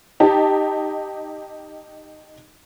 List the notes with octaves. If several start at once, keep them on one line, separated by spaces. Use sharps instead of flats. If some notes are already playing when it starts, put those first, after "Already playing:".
D#4 G4 A5